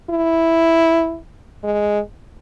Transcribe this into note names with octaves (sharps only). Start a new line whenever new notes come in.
E4
G#3